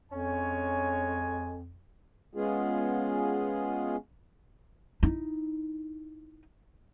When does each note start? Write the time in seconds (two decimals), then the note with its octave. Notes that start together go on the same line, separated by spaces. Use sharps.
0.12 F2 G#3 C#4 C#5 G#5
2.34 G#3 B3 C#4 F4 G#4
5.03 D#4 E4